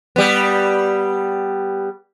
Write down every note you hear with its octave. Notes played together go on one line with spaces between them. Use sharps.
G3 B3